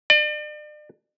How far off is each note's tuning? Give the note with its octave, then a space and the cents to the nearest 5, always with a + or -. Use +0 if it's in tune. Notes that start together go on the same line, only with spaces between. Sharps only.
D5 +40